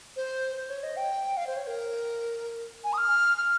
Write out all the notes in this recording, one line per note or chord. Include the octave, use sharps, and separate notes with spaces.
C5
C5
C#5
D#5
G5
F5
C5
C#5
A#4
G#5
D#6
F6
F6